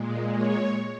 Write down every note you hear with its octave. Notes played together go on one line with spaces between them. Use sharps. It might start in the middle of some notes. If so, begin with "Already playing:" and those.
Already playing: A#2 G#3
C#5